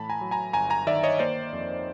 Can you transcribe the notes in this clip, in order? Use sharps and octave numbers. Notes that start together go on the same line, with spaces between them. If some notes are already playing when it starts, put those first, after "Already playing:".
Already playing: A2 E3 A5 B5
G#5 A#5
F#3
G#5 A#5
G1 G#5 A#5
G#5 A#5
D#3 D5 E5
C#5 D#5
A#3 C5 D5
F2